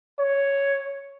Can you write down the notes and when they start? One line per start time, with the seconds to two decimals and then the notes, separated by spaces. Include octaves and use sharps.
0.19 C#5